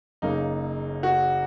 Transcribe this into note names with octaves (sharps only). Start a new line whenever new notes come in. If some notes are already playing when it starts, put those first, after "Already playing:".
F#1 F#2 C#3 A#3 D#4
F#4